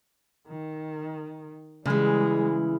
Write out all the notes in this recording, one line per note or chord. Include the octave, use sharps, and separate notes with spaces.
D#3
C#3 E3 G3 G#3